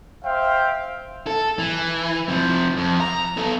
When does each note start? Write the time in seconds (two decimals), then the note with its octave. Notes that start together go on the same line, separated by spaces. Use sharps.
0.24 C5 E5 F5 G5
1.27 A4
1.59 E3
2.28 C3 F3
2.77 F2
3.00 A#5
3.37 B3 A4